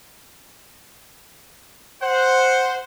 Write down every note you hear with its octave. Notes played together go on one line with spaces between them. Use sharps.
C5 F#5